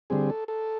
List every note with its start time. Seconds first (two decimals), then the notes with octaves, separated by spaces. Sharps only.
0.10 D3 G3 C4 G#4
0.30 A4
0.48 A4